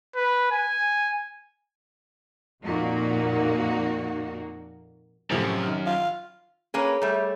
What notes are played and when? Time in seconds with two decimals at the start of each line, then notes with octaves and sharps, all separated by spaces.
0.16 B4
0.51 G#5
2.64 F2 A#2 F3 A#3 D#4 F#4
5.30 F#2 A2 C3 F3 A#4
5.63 D#3 F6
5.86 F4
6.74 A#3 C#4 G#4 B4 C#5
7.02 G3 A3